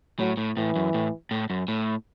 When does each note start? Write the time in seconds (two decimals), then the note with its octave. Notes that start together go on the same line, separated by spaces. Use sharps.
0.19 A2 F#3
0.37 A2
0.57 A2 E3
0.76 F#2
0.94 A2
1.31 A2
1.50 F#2
1.68 A2